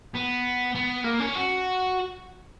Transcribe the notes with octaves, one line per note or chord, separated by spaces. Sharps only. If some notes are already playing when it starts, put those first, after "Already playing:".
B3
B3
A#3
C#4
F#4